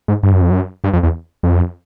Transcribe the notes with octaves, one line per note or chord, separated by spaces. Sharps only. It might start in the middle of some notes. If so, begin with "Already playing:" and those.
G#2
G2
F#2
F2
F#2
G2
F2
E2
F2